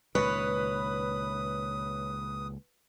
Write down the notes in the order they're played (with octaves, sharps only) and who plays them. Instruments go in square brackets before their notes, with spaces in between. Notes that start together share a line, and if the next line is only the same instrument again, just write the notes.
[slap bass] C#2 A#2 D#3 [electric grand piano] B4 B5 [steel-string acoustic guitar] C#5 [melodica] D#6